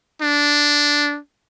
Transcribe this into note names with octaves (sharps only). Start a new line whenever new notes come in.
D4